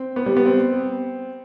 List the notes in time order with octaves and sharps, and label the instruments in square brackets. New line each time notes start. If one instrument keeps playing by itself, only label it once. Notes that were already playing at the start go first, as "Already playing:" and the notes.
Already playing: [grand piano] C4
B3
G3
B3
C4